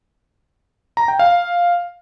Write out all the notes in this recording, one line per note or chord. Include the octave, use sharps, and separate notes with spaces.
A#5
G5
F5